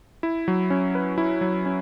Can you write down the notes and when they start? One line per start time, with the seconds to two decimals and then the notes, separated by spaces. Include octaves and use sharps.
0.23 E4
0.48 F#3
0.70 C#4
0.95 B4
1.18 E4
1.41 F#3
1.65 C#4